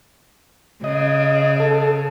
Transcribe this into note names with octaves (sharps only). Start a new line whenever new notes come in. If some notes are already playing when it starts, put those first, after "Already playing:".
C#3 D#5
A4